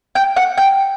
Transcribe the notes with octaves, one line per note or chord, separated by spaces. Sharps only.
G5
F#5
G5